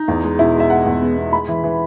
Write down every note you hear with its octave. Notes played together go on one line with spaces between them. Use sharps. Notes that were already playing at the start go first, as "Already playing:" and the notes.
Already playing: D#4
E2
G#3
B2 E4
G#3
E5
G#3 F#5
E2
B3
B3
G#3 B5
E3
E3